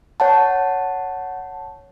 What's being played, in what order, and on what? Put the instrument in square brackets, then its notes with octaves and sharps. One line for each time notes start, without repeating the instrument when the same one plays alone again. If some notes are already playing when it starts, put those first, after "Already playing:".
[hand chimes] C#5 F#5 A5